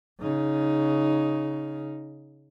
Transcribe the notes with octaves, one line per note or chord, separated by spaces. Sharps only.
C#3 D#4